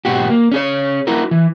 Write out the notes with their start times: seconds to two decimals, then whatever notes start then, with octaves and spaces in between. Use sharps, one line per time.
0.05 G#2 B2 F#4 G4
0.30 A#3
0.52 C#4 G#4 C#5
1.07 E4 F#4 A#4
1.31 E3